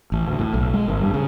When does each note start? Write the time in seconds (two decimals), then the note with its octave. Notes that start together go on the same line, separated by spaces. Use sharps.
0.12 A1
0.28 D2
0.39 A2
0.54 B1
0.74 G#3
0.88 G#1
1.00 G2
1.14 C#3